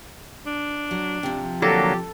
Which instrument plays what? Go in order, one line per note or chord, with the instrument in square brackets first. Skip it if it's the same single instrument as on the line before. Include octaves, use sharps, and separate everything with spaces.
[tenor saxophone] D4
[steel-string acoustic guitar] F#3
C3 F3
[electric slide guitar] D3 F#3 A#3 [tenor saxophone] G4 [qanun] A4